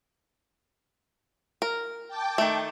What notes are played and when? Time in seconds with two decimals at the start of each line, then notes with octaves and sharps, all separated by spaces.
1.62 A#4
2.08 G5 A5 D6
2.38 D#3 A3